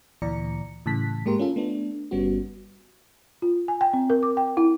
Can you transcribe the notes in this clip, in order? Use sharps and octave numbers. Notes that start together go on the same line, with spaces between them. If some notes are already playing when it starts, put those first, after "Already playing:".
D2 A#2 E3 D5 A#5 C#7
A2 C#3 E3 A5 F#6 B6
G#2 G#3 A#3 G4 A#4 C6
C#4 F4 A4
A3 B3 D4
G1 G3 B3 C#4 F#4
F4
G#5
G5
C4
A#4
D6
G5
E4